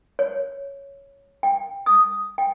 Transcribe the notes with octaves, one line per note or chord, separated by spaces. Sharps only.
C#5
G5
D#6
G5